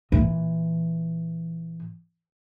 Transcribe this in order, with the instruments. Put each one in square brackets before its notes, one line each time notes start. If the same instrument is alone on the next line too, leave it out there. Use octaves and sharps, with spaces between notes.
[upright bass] A#2 E3